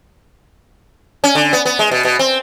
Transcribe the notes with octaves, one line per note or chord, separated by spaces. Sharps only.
C#4
D3
B3
B3
G#3
B2
B2
C4